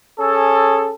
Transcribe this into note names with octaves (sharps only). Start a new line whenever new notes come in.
C#4 G#4 A4